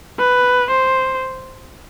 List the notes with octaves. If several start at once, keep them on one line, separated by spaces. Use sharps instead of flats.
B4
C5